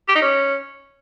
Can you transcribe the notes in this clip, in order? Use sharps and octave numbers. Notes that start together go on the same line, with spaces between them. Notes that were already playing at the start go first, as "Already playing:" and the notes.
G4
D#4
C#4